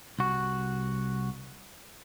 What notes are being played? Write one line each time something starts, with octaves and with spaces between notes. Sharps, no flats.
C2 F#4